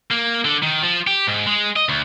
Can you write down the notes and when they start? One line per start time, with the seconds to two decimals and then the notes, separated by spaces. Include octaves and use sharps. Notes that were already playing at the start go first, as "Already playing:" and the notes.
0.11 A#3
0.45 D3
0.62 D#3
0.83 F3
1.07 G4
1.27 G#2
1.46 G#3
1.76 D#5
1.89 D2